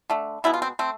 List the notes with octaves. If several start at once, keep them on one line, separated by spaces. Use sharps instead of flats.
D3 A3
B2 G#3 B3 E4
F4
C4
A3 C4